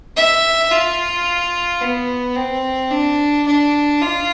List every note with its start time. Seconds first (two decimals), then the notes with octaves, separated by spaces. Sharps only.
0.17 E5
0.71 F4
1.82 B3
2.36 C4
2.91 D4
3.47 D4
4.01 F4